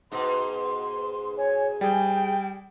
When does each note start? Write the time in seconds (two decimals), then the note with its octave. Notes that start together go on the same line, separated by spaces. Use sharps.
0.12 G#2 B2 C6
1.37 C#5 G#5
1.81 G3 G#4 G5